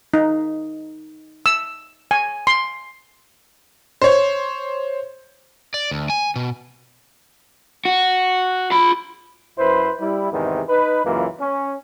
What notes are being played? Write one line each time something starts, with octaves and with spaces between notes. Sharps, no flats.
D#4
E6
G#5
C6
C5 C#5
D5
D2
G#5
B2
F#4
F4 B5
F#2 E4 B4 C5
G3 E4
E2 G#2 C3 D#3 E3
D#4 B4
C#2 F#2 E3 A#3 F4
C#4